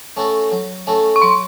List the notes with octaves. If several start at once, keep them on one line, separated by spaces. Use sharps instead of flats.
A3 C#4 F#4 A4
F#3
A3 C#4 F#4 A4
C#6
F#3 C6